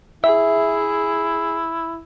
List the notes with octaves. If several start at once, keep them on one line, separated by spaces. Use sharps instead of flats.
E4 G#4 E5